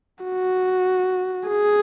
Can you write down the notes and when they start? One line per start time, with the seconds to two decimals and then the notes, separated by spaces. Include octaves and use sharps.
0.24 F#4
1.48 G#4